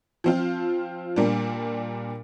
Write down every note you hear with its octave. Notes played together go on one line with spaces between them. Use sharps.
F3 C4 F4
A#2 G3 A#3 D4